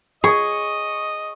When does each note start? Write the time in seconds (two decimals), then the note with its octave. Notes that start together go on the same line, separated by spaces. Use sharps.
0.24 G#4 D#5 C#6 D#6